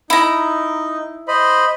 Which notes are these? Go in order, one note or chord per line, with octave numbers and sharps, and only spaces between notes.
D#4 E4 A#5
C5 D#5 B5